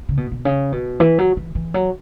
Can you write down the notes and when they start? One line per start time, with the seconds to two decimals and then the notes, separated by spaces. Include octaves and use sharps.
0.09 C#3
0.17 B2
0.32 B2
0.45 C#3
0.72 B2
1.00 E3
1.18 F#3
1.37 E3
1.55 E3
1.74 F#3